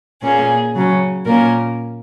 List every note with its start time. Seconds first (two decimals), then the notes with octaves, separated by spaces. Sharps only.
0.22 A#2 A#3 C#4 G#4
0.74 C#3 F#3 C#4
1.25 A#2 A#3 C#4 A#4